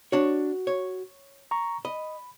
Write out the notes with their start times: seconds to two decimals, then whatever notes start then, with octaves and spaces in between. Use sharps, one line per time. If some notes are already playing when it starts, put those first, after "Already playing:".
0.12 D4 F#4 C#5
0.67 C#5
1.51 A#5 C#6
1.85 D#5 B5